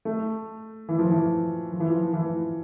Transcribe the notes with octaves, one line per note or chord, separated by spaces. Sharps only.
A3
E3
F3
E3
F3
E3
F3
E3